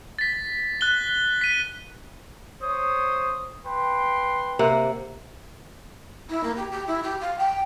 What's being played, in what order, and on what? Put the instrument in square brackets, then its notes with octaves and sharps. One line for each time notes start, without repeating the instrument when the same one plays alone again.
[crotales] A6 B6
F#6 G7
B6 D#7
[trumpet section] C5 C#5 D#6
B4 G5 C6
[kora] C3 A#3 F#5
[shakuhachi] E4
A#3
G4
G4
E4
G4
F5
G5